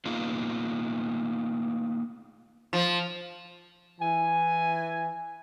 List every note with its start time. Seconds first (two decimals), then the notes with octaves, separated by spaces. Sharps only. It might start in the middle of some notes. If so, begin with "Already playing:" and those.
0.05 A#3 B3 D#4 F4 G#4
2.73 F3
4.01 E3 G#5